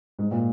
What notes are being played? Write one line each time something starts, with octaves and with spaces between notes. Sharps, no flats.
G#2
A#2